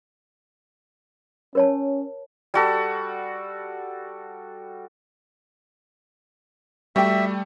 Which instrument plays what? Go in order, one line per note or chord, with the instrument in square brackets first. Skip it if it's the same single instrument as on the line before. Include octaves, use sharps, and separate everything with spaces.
[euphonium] C#4 [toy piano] A#4 C#5 A5
[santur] G3 F#4 A4
[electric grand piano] G3 A3 [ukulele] F#4 D5 G5 [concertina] E5